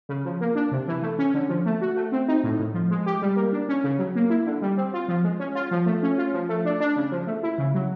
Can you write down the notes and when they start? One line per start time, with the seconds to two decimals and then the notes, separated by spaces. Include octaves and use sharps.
0.09 C#3
0.25 F3
0.41 A#3
0.55 D4
0.72 C3
0.88 E3
1.02 A3
1.19 C#4
1.34 D3
1.49 F3
1.66 A3
1.81 F#4
1.96 A3
2.12 C4
2.28 D#4
2.44 A2
2.59 A2
2.74 F3
2.91 G#3
3.06 G4
3.22 G3
3.36 A#3
3.53 D4
3.69 C#4
3.84 C#3
3.99 F#3
4.15 A#3
4.30 E4
4.46 D3
4.62 G3
4.77 C4
4.94 F4
5.08 F3
5.24 G#3
5.40 C#4
5.55 F4
5.71 F3
5.86 A3
6.03 C#4
6.18 F4
6.34 F3
6.49 A3
6.65 D4
6.80 D4
6.96 C#3
7.12 F3
7.27 A3
7.43 E4
7.58 C#3
7.74 F#3